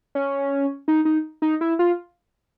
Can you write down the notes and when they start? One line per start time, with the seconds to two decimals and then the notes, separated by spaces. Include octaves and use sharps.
0.15 C#4
0.88 D#4
1.05 D#4
1.42 D#4
1.61 E4
1.79 F4